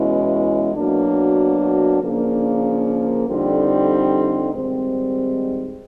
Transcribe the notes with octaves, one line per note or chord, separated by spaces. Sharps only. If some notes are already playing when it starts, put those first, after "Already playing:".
Already playing: E2 B2 G#3 C#4 E4
B2 F#3 A#3 D4
C#3 F3 A#3 D4
F2 D3 G3 C4 D#4
G#2 D#3 G3 C4